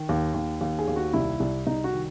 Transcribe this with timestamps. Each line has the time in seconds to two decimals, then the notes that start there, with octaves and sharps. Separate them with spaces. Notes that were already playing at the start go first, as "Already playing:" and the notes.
Already playing: D#3
0.09 D#2
0.34 D#2
0.61 D#2
0.79 G#4
0.88 D#2
0.96 F#4
1.13 C2 E4
1.40 C2
1.67 C2 D#4
1.84 F#4
1.93 D#3